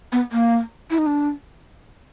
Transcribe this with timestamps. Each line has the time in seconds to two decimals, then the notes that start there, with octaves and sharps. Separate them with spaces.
0.12 B3
0.32 A#3
0.90 E4
0.98 D#4
1.06 D4